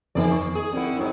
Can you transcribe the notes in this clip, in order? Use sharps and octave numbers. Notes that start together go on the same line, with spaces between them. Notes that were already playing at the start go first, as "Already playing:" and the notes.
F2 D#3 B3 D5 G#5
C#6
G#4
D3 C4 E4 A#4 F#5
G#2 F#3 C4 E4